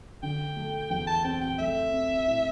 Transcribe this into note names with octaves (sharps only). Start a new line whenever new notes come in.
D3 G5
A3
E2 G5
A5
C4 G5
G5
A3 E5
C4
A2